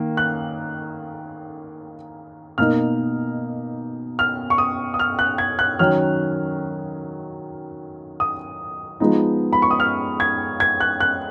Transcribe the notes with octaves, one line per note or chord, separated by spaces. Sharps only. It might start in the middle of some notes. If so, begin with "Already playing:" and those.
Already playing: D#3 A#3
F#6
B2 A#3 D#4 F6
F6
C#6
D#6
D#6
F6
F#6
G#6
F#6
D#3 F#3 C#4 F6
D#6
F3 G#3 B3 D#4
B5
C#6
D#6
F6
G#6
G#6
F#6
F#6